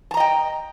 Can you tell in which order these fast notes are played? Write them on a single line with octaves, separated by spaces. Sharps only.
A5 A#5 D#5 G5